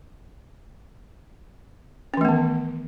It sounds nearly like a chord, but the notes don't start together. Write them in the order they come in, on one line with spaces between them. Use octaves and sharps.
C#4 E3 A3 B3 D#3